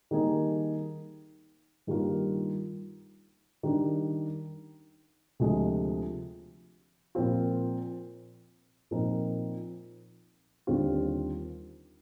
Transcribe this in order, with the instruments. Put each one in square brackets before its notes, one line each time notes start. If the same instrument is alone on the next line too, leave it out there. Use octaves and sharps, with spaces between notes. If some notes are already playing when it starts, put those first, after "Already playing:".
[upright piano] D#3 G3 A#3 D#4 G#4
G2 D#3 G3 A#3 F4
D#3 G3 D4
D2 C3 F3 G#3
A#2 F3 C4 F4
A#2 F3 C4 D#4 A#4
D#2 D3 G3 C4 F4